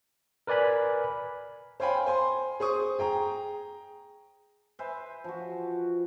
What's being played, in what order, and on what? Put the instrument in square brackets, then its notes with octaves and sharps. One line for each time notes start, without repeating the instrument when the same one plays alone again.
[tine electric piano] A#4 B4 D5 G#5 B5
[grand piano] C5 C#5 F5 G5 G#5 B5
C5 G#5 C6
G#4 C5 C#6 D#6
G#4 G5 A#5
[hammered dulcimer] B4 C5 E5 G#5
F3 F#4